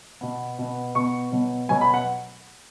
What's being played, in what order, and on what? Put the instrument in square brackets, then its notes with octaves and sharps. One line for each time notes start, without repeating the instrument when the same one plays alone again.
[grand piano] B2 B3
B2 B3
B2 B3 C#6
B2 F#3 B3
B2 F#3 B3 G#5
B5
F#5